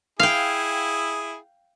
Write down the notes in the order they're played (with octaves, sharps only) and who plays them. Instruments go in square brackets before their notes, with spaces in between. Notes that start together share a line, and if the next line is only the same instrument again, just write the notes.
[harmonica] E4 G#4 [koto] F5 G5